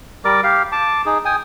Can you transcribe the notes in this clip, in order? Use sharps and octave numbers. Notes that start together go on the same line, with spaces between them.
G3 A#4 D5 D6
G4 F5
A5 D6
D#4 G#4
G5 G#5 D#6